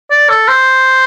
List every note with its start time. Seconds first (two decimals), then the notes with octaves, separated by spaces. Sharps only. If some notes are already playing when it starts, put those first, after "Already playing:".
0.11 D5
0.29 A4
0.48 C5